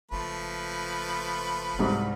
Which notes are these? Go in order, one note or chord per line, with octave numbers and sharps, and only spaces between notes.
F#1 F3 A3 B4
C2 G#2 C3